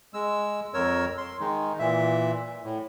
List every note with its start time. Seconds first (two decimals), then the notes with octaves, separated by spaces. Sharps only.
0.14 G#3 E6
0.74 F2 A#4 C#5 E6
1.18 C6
1.40 D#3 G#3 D#4
1.79 A#2 E3 E5
2.64 A2